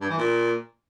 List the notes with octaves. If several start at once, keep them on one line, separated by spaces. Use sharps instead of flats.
G2
E3
A#2